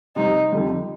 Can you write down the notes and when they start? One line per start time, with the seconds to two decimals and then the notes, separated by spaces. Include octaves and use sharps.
0.16 C3 G3 C4 D#4
0.52 F2 D3 G3